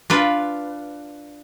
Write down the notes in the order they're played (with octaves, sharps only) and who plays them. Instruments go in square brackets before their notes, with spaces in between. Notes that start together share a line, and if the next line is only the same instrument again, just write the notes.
[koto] D4 F4 B4